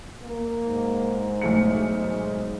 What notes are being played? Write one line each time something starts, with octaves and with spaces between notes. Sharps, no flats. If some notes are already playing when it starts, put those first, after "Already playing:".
A#3
G#2
B1 A3 C#7
G#2 G#3